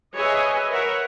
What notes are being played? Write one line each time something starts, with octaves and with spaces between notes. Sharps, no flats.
G#4 B4 C#5 D#5 E5 G#5
A#4 B4 C#5 E5 F#5